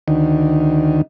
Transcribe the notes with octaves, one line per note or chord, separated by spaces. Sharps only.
D2 D#3